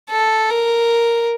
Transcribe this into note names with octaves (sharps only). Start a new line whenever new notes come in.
A4
A#4